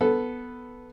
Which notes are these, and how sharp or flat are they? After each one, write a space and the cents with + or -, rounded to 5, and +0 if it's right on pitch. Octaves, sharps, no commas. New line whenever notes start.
B3 +0 A4 +0